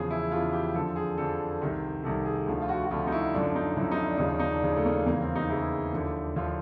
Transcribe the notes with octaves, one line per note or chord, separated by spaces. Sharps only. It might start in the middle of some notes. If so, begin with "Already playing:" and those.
Already playing: E2 C#3 F3 G#4
E4
E2 C#3 F3 F4
G4
F2 D3 F3 A4
G#4
F2 D3 F3 A4
C2 C3 D#3
C2 C3 D#3 A4
G#4
D2 D3 F3
F4
F#4
F#4
D2 D3 F3 F4
D#4
E4
F#2 D3 F3 D4
D4
D#4
F#2 D3 F3 E4
D#4
D4
D#2 C#3 F3 D#4
D4
D#4
D4
D#2 C#3 F3
A3
A#3
E2 C#3 E3 A#3
C4
D#4
E2 C#3 E3 E4
D#2 D3 F3
D#2 D3 F3 F4